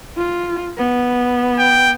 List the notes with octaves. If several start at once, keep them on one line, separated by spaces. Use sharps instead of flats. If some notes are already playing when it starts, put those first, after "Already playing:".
F4
B3
G5